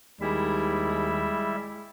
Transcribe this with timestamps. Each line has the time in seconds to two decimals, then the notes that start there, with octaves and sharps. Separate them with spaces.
0.21 D#2 G3 G#3 E4 E5